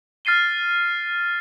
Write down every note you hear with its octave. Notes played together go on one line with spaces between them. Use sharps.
F6 A6 C7 D#7 G7